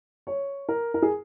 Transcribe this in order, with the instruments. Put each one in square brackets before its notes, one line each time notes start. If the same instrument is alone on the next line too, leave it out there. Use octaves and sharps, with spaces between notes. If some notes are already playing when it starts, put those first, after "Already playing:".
[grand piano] C#5
A#4
A#4
G#4